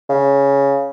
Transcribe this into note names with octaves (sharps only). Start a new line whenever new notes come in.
C#3